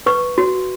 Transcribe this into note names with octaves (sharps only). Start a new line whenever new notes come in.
B4 C#6
F#4